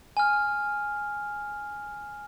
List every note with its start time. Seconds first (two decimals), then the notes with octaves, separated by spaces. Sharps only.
0.17 G#5 F6